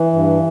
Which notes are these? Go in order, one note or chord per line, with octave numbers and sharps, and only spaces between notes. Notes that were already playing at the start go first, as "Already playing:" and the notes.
Already playing: E3
G2